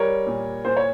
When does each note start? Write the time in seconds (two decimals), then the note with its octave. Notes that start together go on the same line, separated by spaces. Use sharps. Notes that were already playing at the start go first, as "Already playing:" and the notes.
Already playing: G3 A#4 C#5
0.27 A#2
0.65 A#2 C5
0.77 C#5